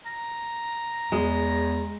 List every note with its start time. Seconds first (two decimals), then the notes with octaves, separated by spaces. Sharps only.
0.06 A#5
1.12 E2 G#3